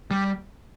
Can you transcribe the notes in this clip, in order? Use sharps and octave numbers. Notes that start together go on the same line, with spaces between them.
G3